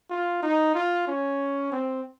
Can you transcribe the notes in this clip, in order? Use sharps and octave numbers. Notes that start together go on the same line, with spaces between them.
F4
D#4
F4
C#4
C4